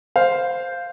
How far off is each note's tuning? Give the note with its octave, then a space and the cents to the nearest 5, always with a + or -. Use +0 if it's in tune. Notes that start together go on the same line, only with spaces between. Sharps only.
C5 -5 F5 +0